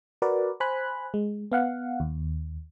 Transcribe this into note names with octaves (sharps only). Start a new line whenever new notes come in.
F#4 A#4 B4 D5
C5 G#5 B5 F#6
G#3
B3 F5 F#5
D#2